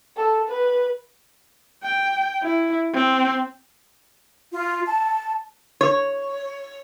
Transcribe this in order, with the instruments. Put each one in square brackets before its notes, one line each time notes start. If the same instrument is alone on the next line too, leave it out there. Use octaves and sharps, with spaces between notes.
[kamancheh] A4
B4
[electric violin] G5
E4
C4
[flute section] F4
A5
[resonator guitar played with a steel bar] C#5